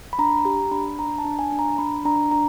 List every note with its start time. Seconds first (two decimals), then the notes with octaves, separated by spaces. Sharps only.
0.13 B5
0.19 D4 A#5
0.45 G4 A#5
0.71 D4 B5
0.99 D4 A#5
1.18 A5
1.25 D4
1.39 G#5
1.52 D4
1.59 A#5
1.78 D4 B5
2.05 D4 A#5
2.31 D4 A#5